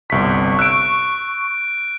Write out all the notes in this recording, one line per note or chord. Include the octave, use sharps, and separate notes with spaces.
G1 C2 C#6 B6
E6 F#6 D7